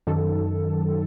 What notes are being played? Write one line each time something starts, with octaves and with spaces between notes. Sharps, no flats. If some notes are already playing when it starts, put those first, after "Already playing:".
F#2 D#3 A4